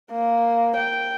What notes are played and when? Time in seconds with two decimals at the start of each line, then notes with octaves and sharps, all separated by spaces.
0.12 A#3
0.77 G5